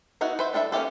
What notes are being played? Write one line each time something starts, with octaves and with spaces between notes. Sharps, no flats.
B3 D#4 E4 F#4 B4
B4 C5 E5
G3 D4 A4 A#4 E5
A#3 C#4 E4 G4 A4